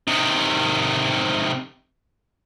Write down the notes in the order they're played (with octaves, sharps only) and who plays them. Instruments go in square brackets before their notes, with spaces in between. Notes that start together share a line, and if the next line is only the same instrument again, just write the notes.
[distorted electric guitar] C3 D#3